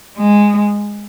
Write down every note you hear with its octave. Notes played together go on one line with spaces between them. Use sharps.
G#3